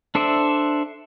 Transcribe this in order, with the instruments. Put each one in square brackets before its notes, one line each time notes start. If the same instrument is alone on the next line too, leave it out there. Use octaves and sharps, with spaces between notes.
[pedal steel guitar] D4 A4 C5 D5 E5